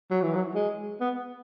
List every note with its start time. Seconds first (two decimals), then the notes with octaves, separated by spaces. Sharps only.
0.11 F#3
0.22 E3
0.35 F#3
0.55 G#3
1.00 B3